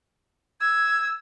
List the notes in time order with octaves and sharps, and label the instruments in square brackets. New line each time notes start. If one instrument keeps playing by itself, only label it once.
[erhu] E6 [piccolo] G#6